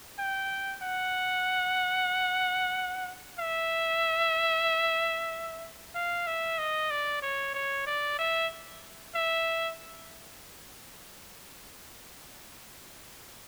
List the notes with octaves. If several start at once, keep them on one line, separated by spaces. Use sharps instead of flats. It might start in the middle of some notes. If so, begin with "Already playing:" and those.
G5
F#5
E5
F5
E5
D#5
D5
C#5
C#5
D5
E5
E5